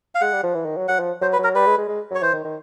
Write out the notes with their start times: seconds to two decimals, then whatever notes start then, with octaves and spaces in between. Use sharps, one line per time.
0.15 F5
0.21 G#3 F#5
0.33 G3
0.44 F3
0.54 E3
0.65 D#3
0.77 F#3
0.88 F#3 F#5
0.99 F3
1.21 F#3 C5
1.33 B4
1.39 F#3
1.44 A#4
1.55 G3 B4
1.66 G#3
1.78 G#3
1.88 G#3
2.11 F#3 C#5
2.22 E3 C5
2.33 D#3
2.44 D#3